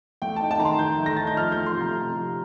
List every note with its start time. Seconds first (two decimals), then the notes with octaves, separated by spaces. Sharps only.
0.22 A3 G5
0.36 D#4 A5
0.51 A5
0.60 D#3 A#5
0.65 C6
0.79 D#3 G6
0.99 A3
1.06 A#6
1.16 D#4 A6
1.27 G6
1.37 F3 F6
1.52 A3 G6
1.66 C6
1.76 C3 A#5
1.96 C3
2.15 F3